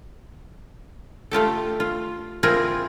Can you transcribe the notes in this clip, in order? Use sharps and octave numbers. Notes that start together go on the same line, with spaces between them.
A3 F4 G4 A4
F4
C4 E4 F4 G#4 A#4